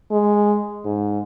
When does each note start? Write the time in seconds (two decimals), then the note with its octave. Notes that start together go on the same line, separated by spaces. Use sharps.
0.12 G#3
0.85 G#2